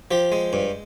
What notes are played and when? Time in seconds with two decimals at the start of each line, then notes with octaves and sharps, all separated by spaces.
0.11 F3 G4
0.32 G#3
0.53 G2